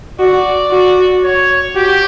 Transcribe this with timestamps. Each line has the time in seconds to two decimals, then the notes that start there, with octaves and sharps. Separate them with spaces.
0.20 F#4 D5
0.71 F#4
1.24 C#5
1.75 F#4 G4